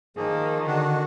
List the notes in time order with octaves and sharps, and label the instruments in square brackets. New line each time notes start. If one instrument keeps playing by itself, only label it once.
[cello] D#3 [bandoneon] F3 A#3 [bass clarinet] G#4
[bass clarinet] D3 [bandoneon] D4 F#4